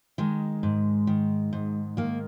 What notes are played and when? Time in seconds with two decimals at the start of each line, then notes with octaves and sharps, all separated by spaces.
0.18 D#3 G#3
0.63 G#2
1.07 D#3
1.53 G#2
1.97 D#3 A#3